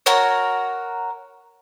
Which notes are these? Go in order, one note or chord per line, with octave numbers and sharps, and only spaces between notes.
F#4 A#4 C#5